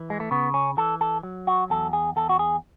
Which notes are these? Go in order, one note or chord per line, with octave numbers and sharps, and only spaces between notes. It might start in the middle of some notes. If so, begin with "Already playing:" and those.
Already playing: E3
G#3
A3
C#3 B3
C#4
E3 A4
A4
F#3
F#4
E2 A4
G#4
E2 A4
F#4
G#4